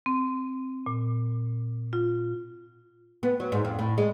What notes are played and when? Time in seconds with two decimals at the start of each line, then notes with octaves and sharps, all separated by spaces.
0.06 C4
0.86 A#2
1.93 F4
3.23 B3
3.40 F#3
3.52 G#2
3.65 F2
3.79 A2
3.98 G#3